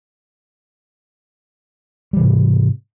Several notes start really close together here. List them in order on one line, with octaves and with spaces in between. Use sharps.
G3 E3 C3 G#2